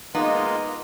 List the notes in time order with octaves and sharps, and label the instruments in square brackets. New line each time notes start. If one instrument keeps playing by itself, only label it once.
[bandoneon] G#3 A#3 F4 [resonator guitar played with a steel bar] B3 D#4